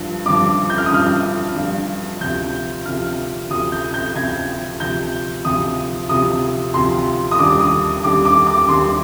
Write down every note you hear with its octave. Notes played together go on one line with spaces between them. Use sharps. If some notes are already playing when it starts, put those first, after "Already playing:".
Already playing: G2 D3 F3
G2 D3 F3 D6
G6
F6
D#6
G2 D3 F3 F6
G2 D3 F3
D2 C3 F3 G6
D2 C3 F3 F6
D2 C3 F3 D#6
G6
G6
D2 C3 F3 G#6
D2 C3 F3 G6
D2 C3 F3 D#6
D2 C3 F3 D#6
D2 C3 F3 C6
D#6
D#2 D3 G3 D6
D#6
D#2 D3 G3 D6
D6
D6
D#2 D3 G3 C6